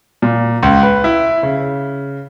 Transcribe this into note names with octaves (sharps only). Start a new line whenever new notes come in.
A#2
C#2
B4
E4
C#3